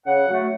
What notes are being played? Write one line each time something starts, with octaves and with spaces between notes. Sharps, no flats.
C#3 F#5
F#3 A3